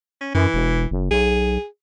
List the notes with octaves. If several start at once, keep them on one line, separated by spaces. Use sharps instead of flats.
C#4
F#2 E3
E1
F#1
B1 G#4